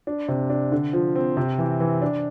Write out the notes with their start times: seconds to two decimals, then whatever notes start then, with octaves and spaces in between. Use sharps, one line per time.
0.07 D4
0.28 C3
0.50 D4
0.72 D3
0.93 F3
1.15 C4
1.37 C3
1.58 E3
1.80 E3
2.02 D4